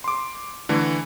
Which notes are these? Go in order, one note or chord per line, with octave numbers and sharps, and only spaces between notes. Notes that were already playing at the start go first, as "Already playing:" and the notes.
C6 D6
D3 E3 A3